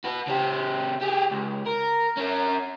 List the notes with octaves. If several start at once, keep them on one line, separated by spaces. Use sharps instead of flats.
F#4 B4
C#3 G4
G4 G#4
C#2
A#4
C#4 A#4